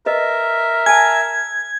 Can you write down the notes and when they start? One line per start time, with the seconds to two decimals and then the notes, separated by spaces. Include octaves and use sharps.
0.06 A#4 B4 D#5 E5
0.86 G#5 A5 G#6